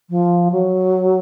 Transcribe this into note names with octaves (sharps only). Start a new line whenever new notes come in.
F3
F#3